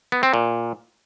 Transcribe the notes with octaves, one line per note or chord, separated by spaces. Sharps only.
B3
C4
A#2